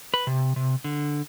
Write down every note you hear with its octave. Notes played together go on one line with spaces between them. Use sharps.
B4
C3
C3
D3